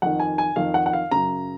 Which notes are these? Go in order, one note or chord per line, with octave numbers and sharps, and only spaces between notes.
F2 D#3 F#5
G#5
G#5
F2 D#3 F5
F#5
F#5
F5
F#2 C#3 A#5